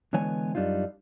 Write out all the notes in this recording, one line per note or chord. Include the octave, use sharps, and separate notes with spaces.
D3 E3 G#3 B3 C#5 G#5
F#2 G3 D4 D#4 F4